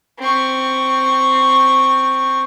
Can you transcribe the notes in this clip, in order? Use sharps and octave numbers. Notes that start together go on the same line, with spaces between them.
C4 C#6